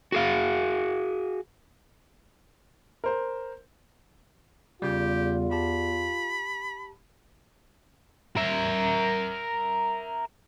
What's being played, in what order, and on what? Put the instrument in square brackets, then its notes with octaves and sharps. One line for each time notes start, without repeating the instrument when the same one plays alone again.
[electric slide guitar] F#4 G#4 F5
[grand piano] A#4 C5
[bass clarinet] E2 [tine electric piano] C#3 G3 [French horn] F4 [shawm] G4
[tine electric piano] G4 A5 [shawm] B5
[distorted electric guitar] A#4 E5